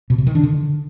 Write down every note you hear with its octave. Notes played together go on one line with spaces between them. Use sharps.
B2
C3
D#3
D4
D3